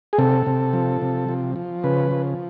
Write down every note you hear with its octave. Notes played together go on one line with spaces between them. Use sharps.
G#4
C3 A4
C3
F3
C3
F3
F3
C#3 B4
F3